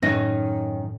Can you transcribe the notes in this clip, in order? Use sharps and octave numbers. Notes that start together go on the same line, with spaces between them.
F#2 A2 D#3 C#4 D#4 A#6